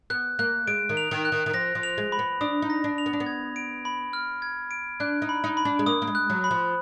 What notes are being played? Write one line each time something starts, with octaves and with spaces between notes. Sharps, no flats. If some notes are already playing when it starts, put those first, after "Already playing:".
B3 F#6
A#3 F#6
G#3 D7
D#3
F7
D#3
F#6
D#3
D#3
F3 A#6
F3
F7
G#3
B5
B3
D4 D#6
D#4
A#6
D4
F7
B3
D4
B3
G#6
D7
B5
F6
G#6
D7
D4 F#6
D#4
B5
D#4
B5
D4
G#3
A#3 D#6
A#3
G#3
F#6
F#3
B5
F3